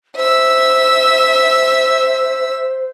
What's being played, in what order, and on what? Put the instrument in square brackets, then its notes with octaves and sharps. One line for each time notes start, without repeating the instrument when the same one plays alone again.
[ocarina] C5 [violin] E5 E6